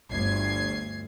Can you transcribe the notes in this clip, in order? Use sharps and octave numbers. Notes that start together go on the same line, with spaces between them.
G1 D2 G#6 C7